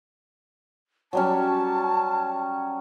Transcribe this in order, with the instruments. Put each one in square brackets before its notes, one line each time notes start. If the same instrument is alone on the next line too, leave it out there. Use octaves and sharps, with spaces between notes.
[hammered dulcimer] F#3 G3 C#4 [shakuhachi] A5